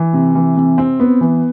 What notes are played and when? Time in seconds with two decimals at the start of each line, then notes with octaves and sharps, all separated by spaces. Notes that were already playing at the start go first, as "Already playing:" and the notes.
Already playing: E3
0.13 C3
0.35 E3
0.56 C3
0.78 C4
1.00 B3
1.21 E3